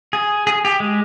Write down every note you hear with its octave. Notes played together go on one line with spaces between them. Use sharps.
G#4
G#4
G4
G#3